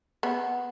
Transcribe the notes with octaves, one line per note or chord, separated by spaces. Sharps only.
B3